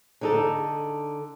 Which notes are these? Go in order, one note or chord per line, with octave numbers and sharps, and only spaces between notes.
D3 D#4 A4